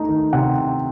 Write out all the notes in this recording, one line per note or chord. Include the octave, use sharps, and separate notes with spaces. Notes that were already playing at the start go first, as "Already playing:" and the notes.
Already playing: A3 D#4
D#3
C3 F#5